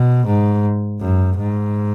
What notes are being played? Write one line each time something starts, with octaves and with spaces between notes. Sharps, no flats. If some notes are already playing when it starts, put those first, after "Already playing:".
Already playing: B2
G#2
F#2
G#2